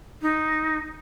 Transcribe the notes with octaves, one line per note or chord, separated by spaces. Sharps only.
D#4